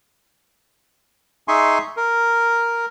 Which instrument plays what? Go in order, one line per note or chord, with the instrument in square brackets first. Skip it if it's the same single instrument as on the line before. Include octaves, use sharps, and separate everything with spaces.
[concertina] D#4 G#4 E5 G#5 C6 C#6
A#4